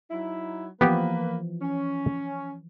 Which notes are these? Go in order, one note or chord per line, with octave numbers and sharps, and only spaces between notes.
F#3 D#4 E4
E3 F3 A#3 B3 G4 B4
C#4